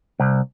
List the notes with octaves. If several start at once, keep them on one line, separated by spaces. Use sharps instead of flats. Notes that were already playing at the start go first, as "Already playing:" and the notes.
C2